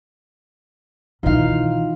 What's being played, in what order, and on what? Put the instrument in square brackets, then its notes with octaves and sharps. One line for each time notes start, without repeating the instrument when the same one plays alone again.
[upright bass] B2 D#3 [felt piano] E3 D#4 [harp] F4 F5